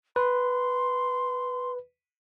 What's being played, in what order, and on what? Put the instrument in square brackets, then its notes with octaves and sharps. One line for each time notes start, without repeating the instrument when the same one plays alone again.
[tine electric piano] B4 [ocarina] C6